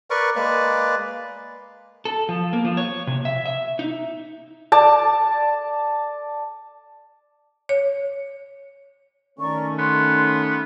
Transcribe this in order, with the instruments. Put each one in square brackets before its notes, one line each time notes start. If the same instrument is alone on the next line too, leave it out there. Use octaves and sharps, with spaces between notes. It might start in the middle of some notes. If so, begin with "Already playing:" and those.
[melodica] A#4 B4 D5 C#6
G#3 A#3 B4 D5
[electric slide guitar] A4
F3
A#3
F3
C#5
C3
E5
E5
D#4
[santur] D5 A5
[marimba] C#5
[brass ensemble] D#3 A3 C#4 [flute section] A#4 D5 C#6
[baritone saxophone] B3 [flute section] C6